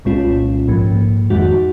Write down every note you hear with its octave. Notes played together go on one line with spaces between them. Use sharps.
C2 A#2 G#3 C#4 F4
A#1 G#2 F3 A#3
F2 D#3 G#3 D#4 F#4